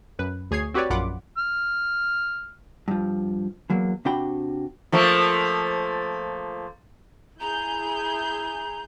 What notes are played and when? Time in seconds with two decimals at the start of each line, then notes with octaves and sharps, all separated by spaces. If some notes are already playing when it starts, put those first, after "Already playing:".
0.19 F#2 B4
0.51 D2 G#4 C#5 G#6 C7
0.74 C4 F#4 G4 B4 C#5 D5
0.90 A#1 F#2 F4 F#5 B5 D6
1.38 F6
2.88 G2 F3
3.70 E2 F#3 A#3
4.05 C3 D4 F#4 G5 B5
4.92 F3 A3 A#3
7.40 E4 G#4 A#5 G6